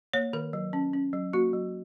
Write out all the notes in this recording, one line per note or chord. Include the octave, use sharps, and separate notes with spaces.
A#3 C#5
D#3 A#4
F#3
C#4
C#4
F#3
A#3 F#4
F#3